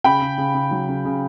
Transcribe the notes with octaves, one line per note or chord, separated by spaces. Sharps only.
C#3 G5 B5
C#3
C#3
C#3
F#3
C#3
C#3